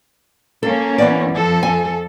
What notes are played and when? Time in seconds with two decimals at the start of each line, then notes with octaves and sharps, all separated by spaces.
0.63 A#3 C#4 A4
0.98 E3 B3 D5
1.30 F2 F3 A4
1.63 G#5